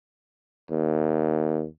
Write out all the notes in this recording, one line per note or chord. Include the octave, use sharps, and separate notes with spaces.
D#2